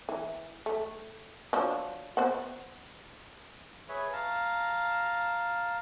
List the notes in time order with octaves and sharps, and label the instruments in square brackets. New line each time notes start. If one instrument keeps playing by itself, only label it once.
[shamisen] E3
A3
F3 F#3 D4
B3 C5 F#5
[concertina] G#4 B4 C#5 E5
F5 A5 A#5